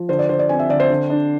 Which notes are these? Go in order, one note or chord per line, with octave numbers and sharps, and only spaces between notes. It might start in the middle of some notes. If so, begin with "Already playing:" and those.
Already playing: F3
D3 C5
D5
D3 C5
D5
C4 G#5
E5
D3 D5
C5
D3
D4